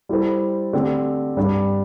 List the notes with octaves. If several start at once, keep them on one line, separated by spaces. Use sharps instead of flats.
G3 E4 A4 C5
D3 A3 C4 G4
G2 G3 D4